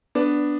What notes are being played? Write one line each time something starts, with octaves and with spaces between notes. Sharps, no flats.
B3 D4